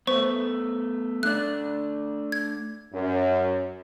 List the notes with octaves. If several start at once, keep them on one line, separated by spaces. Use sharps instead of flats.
A3 B3 C5 C#6
A3 D4 D5 F#6
G#6
F#2